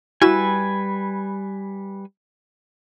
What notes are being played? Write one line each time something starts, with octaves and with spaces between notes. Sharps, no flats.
G3 E4 F#4 B4 G#5 E6